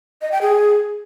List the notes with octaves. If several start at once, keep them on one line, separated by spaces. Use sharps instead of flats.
D#5
G5
G#4